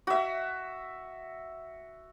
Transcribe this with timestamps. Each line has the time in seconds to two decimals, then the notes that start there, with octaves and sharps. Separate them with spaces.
0.07 F#4 E5